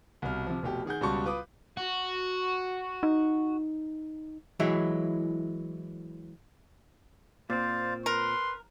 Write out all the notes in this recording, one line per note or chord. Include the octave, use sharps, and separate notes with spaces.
C2 B2 F6
C3 F3
F1 B2 G4
D#3 G#4 F#5 G6
C#2 B2 G3 F#4 A5 C#6
F4 B4 D6 D#6
F#4
D#4
E3 F#3 G#3 E4
A#2 C4 C5 D5 F5
A#4 B4 C6